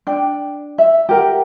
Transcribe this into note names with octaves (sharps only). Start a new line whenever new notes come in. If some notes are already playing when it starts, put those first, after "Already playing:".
D4 G5
E5
G4 A#4 F#5